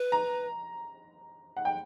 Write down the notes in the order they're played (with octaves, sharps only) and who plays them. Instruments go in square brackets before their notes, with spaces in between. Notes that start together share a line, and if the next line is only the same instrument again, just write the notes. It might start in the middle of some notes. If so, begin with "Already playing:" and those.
Already playing: [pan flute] B4
[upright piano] A#5
F#5
G5